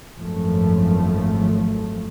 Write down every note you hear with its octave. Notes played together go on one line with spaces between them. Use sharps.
G#1 F#2 F3 A3